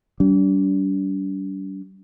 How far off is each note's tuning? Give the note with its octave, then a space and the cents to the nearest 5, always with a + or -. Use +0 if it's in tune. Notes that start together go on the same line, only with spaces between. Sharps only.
G3 -35 D4 -40